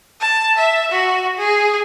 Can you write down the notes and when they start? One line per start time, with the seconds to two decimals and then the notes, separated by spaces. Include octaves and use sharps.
0.21 A5
0.58 E5
0.92 F#4
1.38 G#4